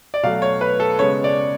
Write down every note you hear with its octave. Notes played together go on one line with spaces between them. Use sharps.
D5
B2 F#3 A3 F5
C#5
B4
A4
C#3 G#3 B3 C#5
D5